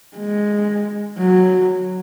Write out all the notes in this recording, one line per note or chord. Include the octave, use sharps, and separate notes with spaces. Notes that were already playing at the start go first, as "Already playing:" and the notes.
G#3
F#3